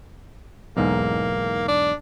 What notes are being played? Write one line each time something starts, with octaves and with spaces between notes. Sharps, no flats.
B1 E2 G#2 A#3
D4